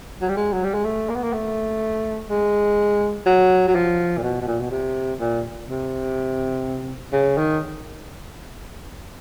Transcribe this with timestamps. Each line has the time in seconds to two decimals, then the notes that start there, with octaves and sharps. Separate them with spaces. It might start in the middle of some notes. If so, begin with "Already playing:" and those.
0.21 F#3
0.28 G3
0.37 G#3
0.53 F#3
0.64 G3
0.74 G#3
0.84 A3
1.09 A#3
1.16 B3
1.24 A#3
1.33 A3
2.30 G#3
3.26 F#3
3.68 F#3
3.75 F3
4.17 A#2
4.23 B2
4.42 B2
4.47 A#2
4.61 B2
4.71 C3
5.20 A#2
5.68 C3
7.13 C#3
7.38 D#3